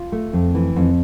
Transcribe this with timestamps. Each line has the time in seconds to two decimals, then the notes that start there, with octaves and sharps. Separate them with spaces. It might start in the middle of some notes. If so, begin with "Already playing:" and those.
Already playing: F4
0.12 A3
0.33 F2
0.55 E3
0.76 F2